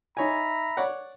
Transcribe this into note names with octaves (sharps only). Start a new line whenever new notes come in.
D#4 C#5 E5 G#5 A#5 B5
C#5 D5 F#5